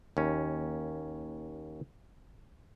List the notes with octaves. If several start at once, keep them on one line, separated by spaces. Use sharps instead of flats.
D#2 C#4